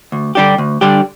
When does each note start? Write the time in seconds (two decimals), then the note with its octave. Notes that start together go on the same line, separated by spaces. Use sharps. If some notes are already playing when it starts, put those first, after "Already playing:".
0.12 D2
0.35 D3 G3 D4 G4
0.58 D2
0.81 D3 G3 D4 G4